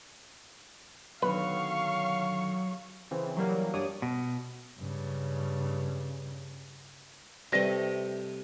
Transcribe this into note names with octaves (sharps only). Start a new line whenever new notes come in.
B2 D3 D#3 F#3 B4 F5 C#6
C#3 E3 C4
E3 F#3 G3 A#3
G2 D4 C#5 D5 D#6
B2
G2 C#3
C3 G3 A3 B4 D5 D#5